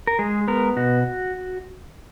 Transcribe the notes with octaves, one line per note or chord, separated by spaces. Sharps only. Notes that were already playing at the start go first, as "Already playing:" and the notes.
A#4
G#3 G#4
B3 A#4
B2 F#4